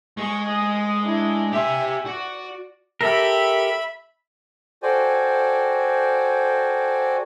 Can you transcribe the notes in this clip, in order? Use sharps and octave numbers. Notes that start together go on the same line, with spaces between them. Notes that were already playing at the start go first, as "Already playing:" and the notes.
G#3 G#4 C#6
D#5 D#6
D4 E4
G4 E5 G#5 C6
F#4 D5
G4 A4 A#4 E5 B5
F#4 A4 C5 D5 G5 G#5